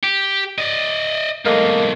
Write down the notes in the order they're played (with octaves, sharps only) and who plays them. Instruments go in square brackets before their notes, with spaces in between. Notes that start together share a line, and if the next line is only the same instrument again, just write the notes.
[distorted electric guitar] G4
D5 D#5
[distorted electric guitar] B1 G#2 [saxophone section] A3 A#3 D#5